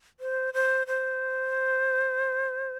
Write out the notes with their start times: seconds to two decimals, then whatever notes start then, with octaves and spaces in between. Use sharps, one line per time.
0.20 C5
0.54 C5
0.87 C5